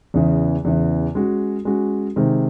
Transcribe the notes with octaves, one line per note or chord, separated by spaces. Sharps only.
E2 C#3 E3
E2 C#3 E3
G#3 C#4 F#4
G#3 C#4 F#4
C3 D#3 G#3